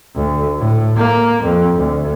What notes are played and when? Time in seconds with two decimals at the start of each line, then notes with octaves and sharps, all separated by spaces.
0.16 D2
0.59 A2
0.97 A#3
1.44 F2
1.78 D2